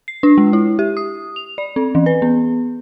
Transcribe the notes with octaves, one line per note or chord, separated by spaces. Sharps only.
C7
D4
G#3
E4
G4
D#6
F7
D5
C4
E3
B4
B3